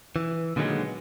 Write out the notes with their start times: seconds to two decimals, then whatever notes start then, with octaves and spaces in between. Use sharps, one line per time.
0.16 E3
0.56 A#2 D3 D#3 F#3 G#3 B3